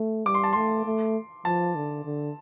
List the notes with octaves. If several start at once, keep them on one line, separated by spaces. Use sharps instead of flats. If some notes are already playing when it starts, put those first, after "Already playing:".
Already playing: A3
G3 D6
C6
A5
A3 C6
A3
F3 A5
D3
D3